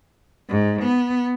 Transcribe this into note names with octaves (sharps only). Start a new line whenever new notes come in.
G#2
B3